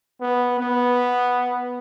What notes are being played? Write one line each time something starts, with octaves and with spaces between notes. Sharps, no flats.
B3
B3